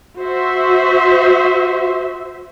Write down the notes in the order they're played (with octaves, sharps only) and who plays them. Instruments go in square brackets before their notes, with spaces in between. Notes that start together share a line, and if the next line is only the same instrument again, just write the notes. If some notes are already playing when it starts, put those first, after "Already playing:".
[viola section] F#4 C5 E5